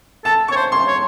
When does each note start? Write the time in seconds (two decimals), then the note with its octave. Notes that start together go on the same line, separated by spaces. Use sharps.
0.25 A4 A5
0.48 C#6
0.52 C#5
0.56 C5
0.72 C6
0.88 C#5